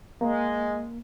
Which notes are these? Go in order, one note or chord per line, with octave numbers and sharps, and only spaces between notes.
G#3 A#3